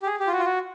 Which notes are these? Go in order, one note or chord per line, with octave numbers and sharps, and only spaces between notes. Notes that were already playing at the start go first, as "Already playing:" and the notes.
G4
G#4
G4
F4
F#4
F4
F#4